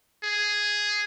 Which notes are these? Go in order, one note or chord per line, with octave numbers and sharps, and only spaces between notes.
G#4